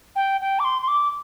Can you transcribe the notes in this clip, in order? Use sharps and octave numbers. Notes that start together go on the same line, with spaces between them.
G5
G5
D6
C6
C6
D6